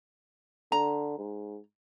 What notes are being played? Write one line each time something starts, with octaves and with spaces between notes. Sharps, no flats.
D3 A#5
G#2